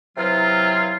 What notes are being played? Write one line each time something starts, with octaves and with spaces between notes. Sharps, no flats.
C3 E3 F#3 F4